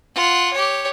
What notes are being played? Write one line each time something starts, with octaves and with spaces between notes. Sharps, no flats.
F4 F#5
G4 C#5